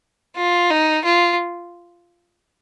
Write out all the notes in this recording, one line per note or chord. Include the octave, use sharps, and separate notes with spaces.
F4
D#4
F4